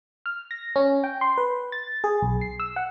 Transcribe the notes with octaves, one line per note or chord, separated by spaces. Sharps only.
F6
A#6
C#4
G5
C6
B4
A6
G#4
B1
C7
E6
F#5